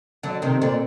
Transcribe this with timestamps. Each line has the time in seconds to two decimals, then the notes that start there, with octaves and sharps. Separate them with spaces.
0.23 D3 F#3
0.42 C3 D#3
0.62 A#2 D3